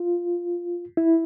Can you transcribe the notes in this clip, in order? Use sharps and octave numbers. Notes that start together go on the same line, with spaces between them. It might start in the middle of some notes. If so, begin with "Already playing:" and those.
Already playing: F4
E4